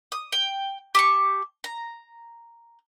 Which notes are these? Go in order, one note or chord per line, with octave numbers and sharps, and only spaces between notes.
D#6
G5
G4 A5 C#6
A#5